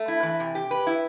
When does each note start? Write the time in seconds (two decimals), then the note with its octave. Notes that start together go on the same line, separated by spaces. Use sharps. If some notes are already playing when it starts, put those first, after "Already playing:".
Already playing: A3
0.08 E4
0.23 E3
0.40 C3
0.55 G4
0.71 B4
0.87 E4